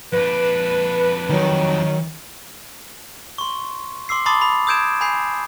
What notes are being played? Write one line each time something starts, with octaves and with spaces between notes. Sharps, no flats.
F2 D4 B4
D#3 F#3
C6 C#6
C6 D6 E6 C7
A5 B5 C6 D6 D#6 A6
B5
D#6 E6 G6 G#6 D7 E7
G#5 B5 G6 C7